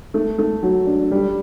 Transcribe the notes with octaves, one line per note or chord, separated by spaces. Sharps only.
A3
A3
F#3
D4
G3